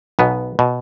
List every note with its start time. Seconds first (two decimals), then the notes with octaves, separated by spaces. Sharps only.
0.19 B1 B2 B3
0.59 B2